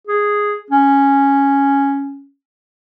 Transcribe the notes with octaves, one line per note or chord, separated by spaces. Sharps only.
G#4
C#4